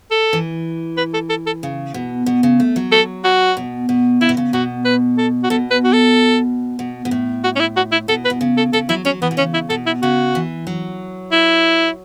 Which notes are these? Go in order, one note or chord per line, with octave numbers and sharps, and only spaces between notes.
A4
E3
B4
A4
A4
A4
C#3
B2
B2
C#3
A3
F#3
A4
F#4
B2
B2
C#3 E4
B2
C#3
B2 F#4
B4
A4
F#4
B2 A4
B4
F#4
A4
B2
B2
A2
F#4
C#4
E4
F#4
E4
B2 A4
B4
B2
C#3
A4
C#3 A4
F#3 E4
F#3 C#4
E3 B3
B2
C#3 C#4
E4
B2 A4
E4
C#3 F#4
E3
F#3
E4